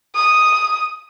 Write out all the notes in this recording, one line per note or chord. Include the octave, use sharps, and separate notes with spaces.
D#6